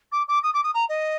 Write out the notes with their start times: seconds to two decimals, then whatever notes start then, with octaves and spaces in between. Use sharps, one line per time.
0.12 D6
0.28 D6
0.43 D#6
0.53 D6
0.63 D#6
0.74 A#5
0.89 D#5